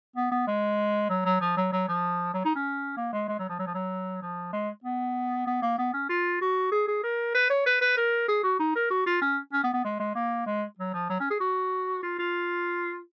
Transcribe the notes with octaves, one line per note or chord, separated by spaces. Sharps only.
B3
B3
G#3
F#3
F#3
F3
F#3
F#3
F3
F#3
D#4
C#4
A#3
G#3
G#3
F#3
F3
F#3
F3
F#3
F3
G#3
B3
B3
A#3
B3
C#4
F4
F#4
G#4
G#4
A#4
B4
C#5
B4
B4
A#4
G#4
F#4
D#4
A#4
F#4
F4
C#4
C#4
B3
B3
G#3
G#3
A#3
G#3
F#3
F3
F#3
C#4
G#4
F#4
F4
F4